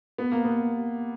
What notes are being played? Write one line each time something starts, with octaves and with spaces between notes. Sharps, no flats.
B3
A#3
B3